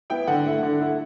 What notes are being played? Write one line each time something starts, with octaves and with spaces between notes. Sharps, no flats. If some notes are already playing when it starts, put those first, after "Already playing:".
B3 E4 G5
D3 F#5
A3 E4
D3
A3 E4